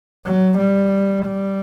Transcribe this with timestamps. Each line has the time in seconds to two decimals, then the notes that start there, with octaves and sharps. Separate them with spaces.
0.25 F#3
0.59 G3
1.26 G3